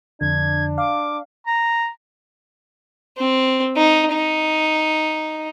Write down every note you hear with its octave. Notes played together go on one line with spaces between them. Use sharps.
F2 D3 D4 G#6
F5 D6
A#5
C4
D#4
D#4